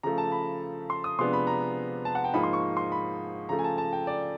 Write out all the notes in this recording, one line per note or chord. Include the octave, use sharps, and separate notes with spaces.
C#3 F3 A3 A#5
A5
B5
C6
D#6
C3 F3 G#3 B3 D4 C6
B5
A#5
A5
F#5
G5
G#2 F3 A#3 D#4 B5
C6
C#6
C6
B5
C#3 F3 A3 A#5
G#5
A5
A5
G5
D5